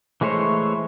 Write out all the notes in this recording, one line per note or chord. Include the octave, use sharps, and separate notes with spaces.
E3 G#3 A3 C5 C#5